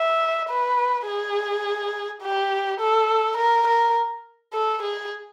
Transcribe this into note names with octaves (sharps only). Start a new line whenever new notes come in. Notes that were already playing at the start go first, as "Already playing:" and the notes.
Already playing: E5
B4
G#4
G4
A4
A#4
A#4
A4
G#4